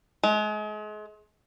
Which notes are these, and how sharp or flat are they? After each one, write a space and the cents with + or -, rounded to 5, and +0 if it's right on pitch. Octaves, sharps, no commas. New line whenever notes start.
G#3 +35